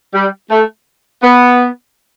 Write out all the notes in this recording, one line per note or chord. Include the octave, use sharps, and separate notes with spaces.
G3
A3
B3